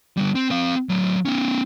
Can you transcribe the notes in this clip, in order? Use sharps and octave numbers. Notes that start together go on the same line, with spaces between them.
D3 G3
C4
C4 F5
A2 F#3
B3 C#4